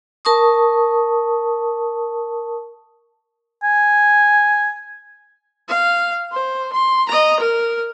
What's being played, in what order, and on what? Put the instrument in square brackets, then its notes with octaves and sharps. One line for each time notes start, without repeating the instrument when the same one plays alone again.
[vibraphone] A#4 A5 C#6 D#6
[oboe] G#5
[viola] F5
C5
C6
D#5 A#5
A#4